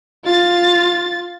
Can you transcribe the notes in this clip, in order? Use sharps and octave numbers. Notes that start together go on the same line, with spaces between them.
F4 A6